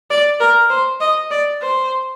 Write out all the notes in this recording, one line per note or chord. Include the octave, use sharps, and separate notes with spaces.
D5
A#4
C5
D#5
D5
C5